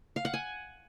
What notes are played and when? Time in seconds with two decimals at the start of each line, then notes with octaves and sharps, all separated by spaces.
0.16 F5
0.25 F#5
0.34 G#5